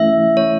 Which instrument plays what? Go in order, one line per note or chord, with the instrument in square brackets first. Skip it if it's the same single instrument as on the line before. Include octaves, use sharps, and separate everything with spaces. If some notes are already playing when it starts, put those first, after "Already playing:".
Already playing: [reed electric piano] E3 A3 C#4 E4 [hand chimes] E5
[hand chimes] C#5